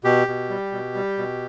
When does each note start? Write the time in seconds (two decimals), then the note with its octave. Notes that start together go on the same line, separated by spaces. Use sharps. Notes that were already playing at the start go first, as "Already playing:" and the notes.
0.04 B2 G4
0.28 B2
0.50 G3
0.72 B2
0.95 G3
1.18 B2